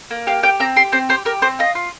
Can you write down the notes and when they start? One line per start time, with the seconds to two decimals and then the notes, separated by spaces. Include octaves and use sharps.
0.11 A#3
0.27 G4 F5
0.43 G4 G5
0.60 C4 A#5
0.76 G4 C6
0.92 C4 C5
1.09 G4 C5
1.25 G4 A#4
1.42 C4 C5
1.59 F4 D#5
1.75 F4